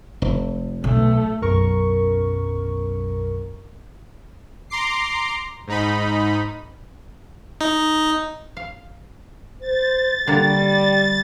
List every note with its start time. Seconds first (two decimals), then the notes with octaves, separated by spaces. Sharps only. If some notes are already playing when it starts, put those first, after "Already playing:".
0.22 F1
0.84 B1 A3
1.42 B1 F#2 A#4 C#6
4.70 A#5 C6 D6 C7
5.67 G#2 D#4 B5
7.61 D#4
8.57 F5
9.60 C5 A6
10.27 D3 G3 A#3 F#4 G5